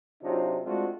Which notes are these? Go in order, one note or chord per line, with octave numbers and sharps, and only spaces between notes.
C3 F#3 D4 D#4 F4
G#3 A3 C4 D4 F4 F#4